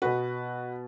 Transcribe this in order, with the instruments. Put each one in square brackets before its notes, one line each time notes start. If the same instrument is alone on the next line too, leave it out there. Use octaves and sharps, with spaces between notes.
[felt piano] B2 B3 F#4 B4